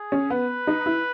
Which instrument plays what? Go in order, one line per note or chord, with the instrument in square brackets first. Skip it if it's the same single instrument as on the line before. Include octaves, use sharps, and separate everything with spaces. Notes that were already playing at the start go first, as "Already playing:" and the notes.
Already playing: [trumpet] G#4
[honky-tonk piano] C#4
[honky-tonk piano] B3 [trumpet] B4
[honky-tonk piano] D#4
E4